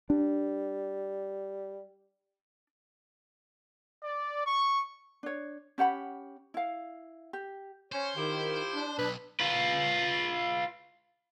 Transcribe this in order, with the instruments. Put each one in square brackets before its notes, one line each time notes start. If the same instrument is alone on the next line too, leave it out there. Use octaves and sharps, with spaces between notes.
[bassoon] G3 [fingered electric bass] D4
[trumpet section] D5
C#6
[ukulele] D4 C#5
C#4 G4 F#5 B5
E4 F5
G4
[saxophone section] C#4 C#5 [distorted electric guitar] C5
[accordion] D#3 [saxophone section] E4 F4 G4
[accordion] D4
[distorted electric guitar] B1 [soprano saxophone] B4
[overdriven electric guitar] F4 B4